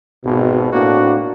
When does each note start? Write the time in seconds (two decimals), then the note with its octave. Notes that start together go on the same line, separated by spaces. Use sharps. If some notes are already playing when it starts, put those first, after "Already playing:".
0.24 G#1 B2
0.73 A2 A#3 C4 D4 F#4